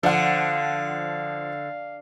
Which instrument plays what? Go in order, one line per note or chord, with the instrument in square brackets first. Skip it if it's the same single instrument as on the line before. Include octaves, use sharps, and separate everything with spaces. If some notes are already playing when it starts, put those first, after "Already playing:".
[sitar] D3 [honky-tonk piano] F3 F#5 [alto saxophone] F5